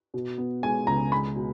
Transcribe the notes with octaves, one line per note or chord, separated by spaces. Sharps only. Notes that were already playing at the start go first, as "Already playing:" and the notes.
B2
B3
G#3 G#5
C#2 A#5
G#3 B5
B2